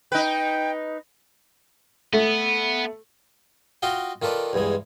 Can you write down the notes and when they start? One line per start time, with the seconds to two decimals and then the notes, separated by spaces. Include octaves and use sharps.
0.12 D#4 B4 G5
2.13 A3 B3
3.82 F4 F#4 D#5 F5 G5
4.22 D#3 F4 A4 B4 D5
4.53 E2 G2 E3 G#3